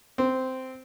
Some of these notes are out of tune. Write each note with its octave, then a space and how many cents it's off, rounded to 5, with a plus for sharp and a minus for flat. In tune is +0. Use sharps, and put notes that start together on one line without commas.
C4 -10